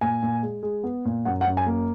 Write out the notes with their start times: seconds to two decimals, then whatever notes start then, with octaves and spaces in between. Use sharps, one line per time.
0.01 A#2 G#5
0.22 A#2
0.43 G#3
0.63 G#3
0.84 B3
1.05 A#2
1.25 F#2 F#5
1.41 F#5
1.47 F#2
1.57 G#5
1.66 A#3